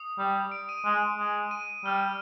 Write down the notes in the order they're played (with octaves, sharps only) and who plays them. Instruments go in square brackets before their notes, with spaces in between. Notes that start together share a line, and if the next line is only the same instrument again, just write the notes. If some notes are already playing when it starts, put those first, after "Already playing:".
Already playing: [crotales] D#6
[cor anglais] G3
[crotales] D7
D#7
[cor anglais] G#3
G#3
[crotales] D#7
[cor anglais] G3 [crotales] F6